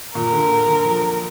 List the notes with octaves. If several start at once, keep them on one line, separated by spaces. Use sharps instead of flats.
A#2 A#4
D3
D3
F3